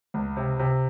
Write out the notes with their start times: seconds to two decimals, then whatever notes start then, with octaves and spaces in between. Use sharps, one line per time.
0.14 C#2
0.37 C3
0.59 C3